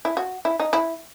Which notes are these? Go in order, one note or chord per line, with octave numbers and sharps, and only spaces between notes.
E4
F#4
E4
D#4
E4